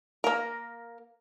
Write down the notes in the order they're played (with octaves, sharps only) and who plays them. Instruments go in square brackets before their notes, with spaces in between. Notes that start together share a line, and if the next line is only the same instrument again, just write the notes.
[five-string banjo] A#3 A#4